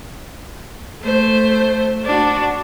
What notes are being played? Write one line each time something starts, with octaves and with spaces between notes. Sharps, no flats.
A3 C5
D4 F#4